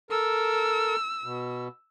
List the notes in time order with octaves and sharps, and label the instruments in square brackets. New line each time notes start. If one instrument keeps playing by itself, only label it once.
[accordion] A4 A#4 [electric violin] E6
[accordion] B2